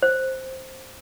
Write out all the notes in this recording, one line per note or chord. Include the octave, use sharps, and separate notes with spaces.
C5